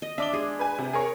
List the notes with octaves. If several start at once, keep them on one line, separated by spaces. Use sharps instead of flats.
D#5
D4 E5 D6 G7
G#3 G#4
B4 G#5
C3
G#4 A#4 C#5